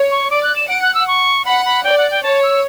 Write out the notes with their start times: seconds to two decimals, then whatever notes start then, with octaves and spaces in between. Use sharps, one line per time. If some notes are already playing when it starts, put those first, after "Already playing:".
Already playing: C#5
0.11 C#6
0.31 D5 D6
0.43 F#6
0.56 E7
0.68 F#5 D7
0.82 F#6
0.95 E6
1.08 C#6
1.46 F#5 B5
1.65 B5
1.84 D5 G5
1.98 F#5
2.11 G5
2.23 C#5 A5
2.43 E6